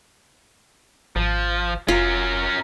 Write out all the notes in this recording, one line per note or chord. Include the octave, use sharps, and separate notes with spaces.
G#1 F3
F1 C#4 F4 A#4